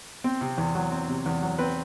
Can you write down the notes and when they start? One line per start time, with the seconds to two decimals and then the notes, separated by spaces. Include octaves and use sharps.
0.24 C4
0.41 C3
0.58 E2
0.75 F#3
0.91 C4
1.09 C3
1.26 E2
1.42 F#3
1.59 C4 B4